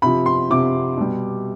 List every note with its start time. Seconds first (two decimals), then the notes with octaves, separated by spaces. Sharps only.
0.02 C3 F3 B5
0.26 C6
0.50 C3 F3 D6
0.97 B2 G3